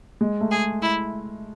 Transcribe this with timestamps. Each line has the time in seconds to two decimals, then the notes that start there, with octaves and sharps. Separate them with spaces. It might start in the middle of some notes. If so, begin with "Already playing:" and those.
0.21 G#3
0.41 A3
0.51 G#4
0.82 E4